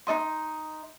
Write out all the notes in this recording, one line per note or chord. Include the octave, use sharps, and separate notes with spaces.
D#4 A4 D#5 C6